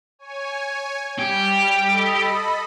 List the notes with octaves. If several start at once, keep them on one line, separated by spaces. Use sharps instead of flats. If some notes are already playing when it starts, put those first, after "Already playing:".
C#5 G#5
G3 G4
A4 D#5 B5